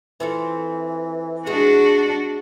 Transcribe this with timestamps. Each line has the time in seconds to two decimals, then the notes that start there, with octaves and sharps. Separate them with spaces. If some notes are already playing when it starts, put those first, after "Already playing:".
0.20 E3 C4 F4 A4
1.46 G3 G#3 D4 F#4 G#4